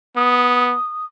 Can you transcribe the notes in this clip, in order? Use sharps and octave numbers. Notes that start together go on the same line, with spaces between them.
B3 D#6